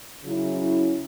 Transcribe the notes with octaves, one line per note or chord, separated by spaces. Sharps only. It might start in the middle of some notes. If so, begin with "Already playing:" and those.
C#3 F#3 C#4 E4